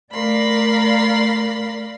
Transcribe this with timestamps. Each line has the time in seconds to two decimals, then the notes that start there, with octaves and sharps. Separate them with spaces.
0.13 A3 A#4 D5 F5 B5 C6